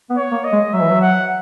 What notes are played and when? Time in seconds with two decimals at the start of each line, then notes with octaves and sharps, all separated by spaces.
0.10 B3
0.17 C#5
0.32 A#3
0.45 D#5
0.53 G#3
0.73 F#3 E5
0.82 E3
0.90 F#3
1.01 F#5